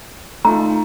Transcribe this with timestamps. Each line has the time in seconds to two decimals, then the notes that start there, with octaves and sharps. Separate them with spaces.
0.45 A3 D#4 F4 A#5